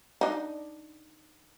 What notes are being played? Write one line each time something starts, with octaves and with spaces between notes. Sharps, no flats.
D4 D#4